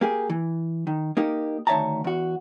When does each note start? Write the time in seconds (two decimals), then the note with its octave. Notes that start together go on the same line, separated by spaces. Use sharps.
0.01 A#3 G4 G#4
0.30 E3
0.87 D#3
1.17 A#3 D#4 G4
1.67 D2 D#3 C#5 E5 A5 A#5
2.04 E2 F#4